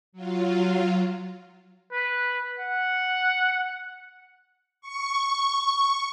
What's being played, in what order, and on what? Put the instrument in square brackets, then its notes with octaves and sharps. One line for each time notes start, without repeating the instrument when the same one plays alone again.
[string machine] F#3 F4
[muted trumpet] B4
F#5
[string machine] C#6